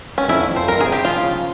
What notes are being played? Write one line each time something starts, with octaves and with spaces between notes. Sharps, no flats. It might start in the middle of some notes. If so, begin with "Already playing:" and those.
C#4
F2 E4
F2
C5
G2 A#4
G#4
C4
G4
F3 F4
C#3